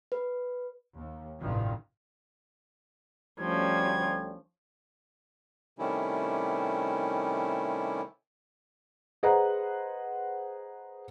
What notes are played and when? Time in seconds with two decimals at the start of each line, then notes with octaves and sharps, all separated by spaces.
0.12 B4
0.97 D#2
1.39 A1 G2 C3 D#3 F3
3.40 D2 F3 G3 C#4 G#6
5.79 C3 D#3 G3 A3 C#4 E4
9.23 G#4 B4 C5 D#5 F#5 A#5